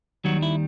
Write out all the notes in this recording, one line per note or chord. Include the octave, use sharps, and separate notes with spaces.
D#2 D#3 F#3 G3 F#4
E4